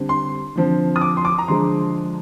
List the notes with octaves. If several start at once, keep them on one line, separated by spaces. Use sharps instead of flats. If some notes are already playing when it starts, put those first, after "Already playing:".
Already playing: D3 G3 C4
C6
D3 F3 C4
D#6
D6
C6
D6
A#5
D3 F3 G#3 C6